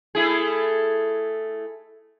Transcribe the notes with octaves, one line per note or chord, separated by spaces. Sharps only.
A3 E4 G#4